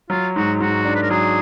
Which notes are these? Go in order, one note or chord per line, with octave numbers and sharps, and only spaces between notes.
F#3 F4
G#2 F#4
G#2 F#4
D4
B4
A#4
F#3 G#4